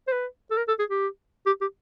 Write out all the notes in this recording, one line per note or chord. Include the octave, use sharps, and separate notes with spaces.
C5
B4
A4
A#4
A4
G#4
G4
G4
G4